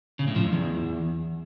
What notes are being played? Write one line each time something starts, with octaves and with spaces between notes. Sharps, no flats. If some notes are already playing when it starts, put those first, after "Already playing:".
C#3
A2
F3
F2
E2